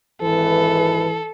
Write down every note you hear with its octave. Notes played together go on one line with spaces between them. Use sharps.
G#1 E3 A4 B4